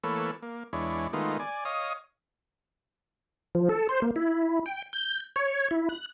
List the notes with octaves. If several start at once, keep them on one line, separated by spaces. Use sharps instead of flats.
E3 A3 A#3 A4 B4 C#5
A#3
E2 G#3 D4 E4 C#5
D#3 G#3 A3 B3 D#4 F4
D5 G#5
C#5 D#5 F5 D#6
F3
A4
C5
A#3
E4
G5
G6
C#5
E4
F#6